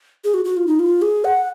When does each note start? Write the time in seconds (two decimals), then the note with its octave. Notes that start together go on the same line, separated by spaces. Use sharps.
0.24 G#4
0.34 F#4
0.45 F#4
0.57 F4
0.67 D#4
0.79 F4
1.02 G#4
1.25 F#5